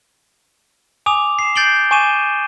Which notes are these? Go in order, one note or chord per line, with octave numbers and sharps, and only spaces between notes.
G#5 D6 D#6 F7
C7 E7
G6 A6 C7 D7 F#7 G7
G#5 C#6 D6 D#7 E7